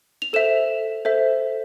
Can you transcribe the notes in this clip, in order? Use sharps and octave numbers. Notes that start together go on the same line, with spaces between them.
F7
A4 C5 E5 E7
A4 C5 E5